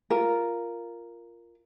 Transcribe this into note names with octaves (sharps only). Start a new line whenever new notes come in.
F4 A#4